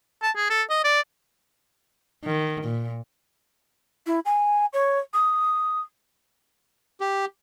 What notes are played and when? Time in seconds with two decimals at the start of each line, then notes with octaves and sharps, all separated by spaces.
0.22 A5
0.36 G#4
0.50 A4
0.70 D#5
0.84 D5
2.25 D#3
2.65 A#2
4.06 E4
4.25 G#5
4.73 C#5
5.14 D#6
7.01 G4